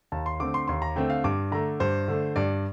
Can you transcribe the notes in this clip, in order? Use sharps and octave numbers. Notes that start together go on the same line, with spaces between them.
D#2 A5
C6
D3 A3 C4 D6
C6
D#2 C6
A#5
D3 A3 C4 G5
F5
G2 D6
D3 A3 A#5
G2 C5
D3 A3
G2 D5